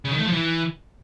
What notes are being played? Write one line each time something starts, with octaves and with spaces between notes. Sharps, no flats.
C#3
D#3
A3
F3
E3